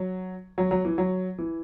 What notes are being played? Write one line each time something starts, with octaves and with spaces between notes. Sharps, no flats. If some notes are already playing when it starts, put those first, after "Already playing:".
Already playing: F#3
F#3
F#3
E3
F#3
E3